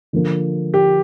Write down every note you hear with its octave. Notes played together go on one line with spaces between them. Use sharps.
D3 F3 A#3
G4